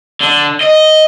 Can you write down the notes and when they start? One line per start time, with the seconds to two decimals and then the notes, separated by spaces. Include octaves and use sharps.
0.21 D3
0.61 D#5